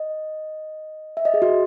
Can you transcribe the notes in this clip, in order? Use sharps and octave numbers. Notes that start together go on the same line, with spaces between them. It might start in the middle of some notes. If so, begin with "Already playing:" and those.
Already playing: D#5
E5
D#5
G#4
F#4